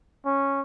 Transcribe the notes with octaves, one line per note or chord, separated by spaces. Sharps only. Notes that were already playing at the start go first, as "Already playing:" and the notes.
C#4